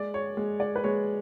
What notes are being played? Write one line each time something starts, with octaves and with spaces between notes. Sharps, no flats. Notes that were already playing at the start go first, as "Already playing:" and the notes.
Already playing: G#3 D5
C#5
G#3
D5
B4
G#3 C#5